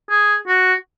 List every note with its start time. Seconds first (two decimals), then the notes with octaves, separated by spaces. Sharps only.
0.10 G#4
0.47 F#4